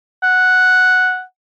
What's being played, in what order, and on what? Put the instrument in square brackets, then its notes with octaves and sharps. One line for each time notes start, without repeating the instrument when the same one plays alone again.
[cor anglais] F#5